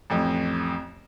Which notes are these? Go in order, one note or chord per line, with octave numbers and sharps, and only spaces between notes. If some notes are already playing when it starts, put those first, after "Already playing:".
A1 F2